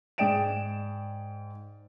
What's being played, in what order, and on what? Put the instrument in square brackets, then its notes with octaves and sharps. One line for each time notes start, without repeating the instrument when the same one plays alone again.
[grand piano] G#2 G#4 D5 G5 D7 E7